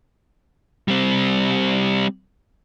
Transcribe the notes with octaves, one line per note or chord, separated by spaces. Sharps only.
G3 C4